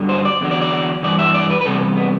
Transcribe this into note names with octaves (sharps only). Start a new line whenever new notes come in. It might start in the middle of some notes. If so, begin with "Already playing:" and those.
Already playing: G2 D3 F#3
C5
D5
E2 D3 F#3
D5
D5
G2 E3 D5
E5
D5
B4
B4
E2 C3 G3 A4
B3